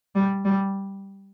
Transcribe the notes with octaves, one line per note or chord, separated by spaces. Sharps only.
G3
G3